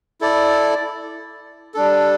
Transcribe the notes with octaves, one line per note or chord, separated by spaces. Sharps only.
E4 A4 D5
G3 D4 A4